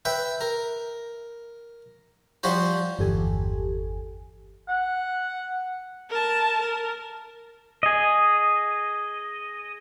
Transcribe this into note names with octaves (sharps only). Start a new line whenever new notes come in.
B4 E5 G5
A#4
F3 G3 F#4 C5
G1 E2 G4 A4 G#5
F#5
A#4 A5
A#4
G#4 D#5